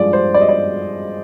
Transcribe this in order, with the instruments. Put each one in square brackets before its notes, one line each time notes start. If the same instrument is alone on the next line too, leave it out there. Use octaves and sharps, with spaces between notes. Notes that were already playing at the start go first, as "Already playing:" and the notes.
Already playing: [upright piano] G2 F3 G#3 D5
C5
D5
D#5
D5